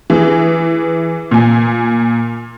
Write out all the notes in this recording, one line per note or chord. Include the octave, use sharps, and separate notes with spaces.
E3 G#4
A#2 G#5